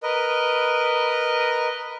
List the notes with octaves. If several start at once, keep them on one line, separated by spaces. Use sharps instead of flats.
A#4 B4 D#5